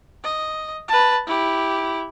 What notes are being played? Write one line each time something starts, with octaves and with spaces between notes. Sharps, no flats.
D#5
B4 A5
E4 G4